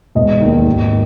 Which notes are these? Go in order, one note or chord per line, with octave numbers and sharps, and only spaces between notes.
E1 D#5
D#2 D#3
G#1